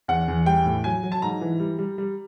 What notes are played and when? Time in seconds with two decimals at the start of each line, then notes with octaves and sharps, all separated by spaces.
0.08 E2 F#5
0.28 E2
0.46 G3 G5
0.65 A2
0.84 F#3 G#5
1.03 F#3
1.12 A5
1.22 G#2 A#5
1.41 E3
1.60 G3
1.79 G3
1.98 G3